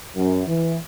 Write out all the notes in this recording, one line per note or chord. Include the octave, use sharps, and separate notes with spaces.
F#2
E3